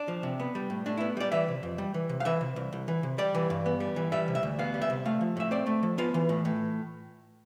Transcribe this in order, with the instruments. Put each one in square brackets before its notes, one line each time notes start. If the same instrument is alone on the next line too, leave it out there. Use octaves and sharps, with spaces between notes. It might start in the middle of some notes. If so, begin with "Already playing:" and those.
Already playing: [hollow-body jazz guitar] D4
F3
C3
B3
G3
A2
A2 D4
B3 E4
G3 D5
E3 E5
C3
F2
G3
E3
C3
F5
E3 E5
C3
C2
C2
E3
C3
G3 D5
E3
G2
B3
G3
E3
G3 E5
C3
E5
D2
B3 F5
G3
E5
C3
A3 F5
F3
A2 E5
C4 D5
A3
F3
B3 F4
E3
A2
A2